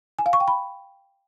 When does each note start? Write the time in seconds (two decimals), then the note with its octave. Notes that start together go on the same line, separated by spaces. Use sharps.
0.19 G#5
0.26 F5
0.33 C#6
0.40 G5
0.48 B5